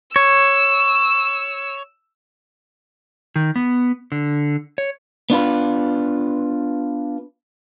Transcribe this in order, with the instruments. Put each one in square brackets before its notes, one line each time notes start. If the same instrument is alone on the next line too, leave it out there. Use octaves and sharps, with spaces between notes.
[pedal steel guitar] C#5 [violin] E6
[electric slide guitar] D#3
B3
D3
C#5
[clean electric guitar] B3 D4 F4 B4